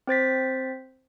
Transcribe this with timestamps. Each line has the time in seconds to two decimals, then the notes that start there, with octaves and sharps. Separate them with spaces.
0.07 C4 C5 A6 B6